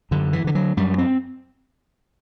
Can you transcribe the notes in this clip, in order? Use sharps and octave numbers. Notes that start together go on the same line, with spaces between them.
F#2 D3
E3
D3 E3
F#3
F#2 G3
C4